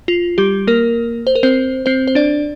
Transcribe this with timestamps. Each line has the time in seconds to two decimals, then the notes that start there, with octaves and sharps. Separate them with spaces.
0.08 F4
0.38 G3 G4
0.67 A#3 A#4
1.27 C5
1.35 A#4
1.43 C4 C5
1.86 C4 C5
2.08 C5
2.15 D4 D5